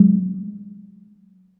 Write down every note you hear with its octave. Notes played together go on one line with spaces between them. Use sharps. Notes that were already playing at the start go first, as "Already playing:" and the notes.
Already playing: F#3 G#3